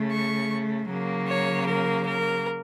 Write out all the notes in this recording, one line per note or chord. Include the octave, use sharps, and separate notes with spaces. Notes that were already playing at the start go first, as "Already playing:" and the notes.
Already playing: C#3 A3
C#6
C#3 F#3 A#3
C#5
A#4
A#4